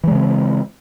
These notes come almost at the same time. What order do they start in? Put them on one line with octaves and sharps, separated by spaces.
E3 G#3 C#3 C4